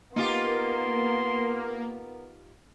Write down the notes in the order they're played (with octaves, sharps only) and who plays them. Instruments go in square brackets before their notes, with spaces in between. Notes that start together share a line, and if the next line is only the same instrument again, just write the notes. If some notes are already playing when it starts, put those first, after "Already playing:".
[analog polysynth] A#3 [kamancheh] B3 A#4 [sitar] D#4 F4 G4 [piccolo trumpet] C6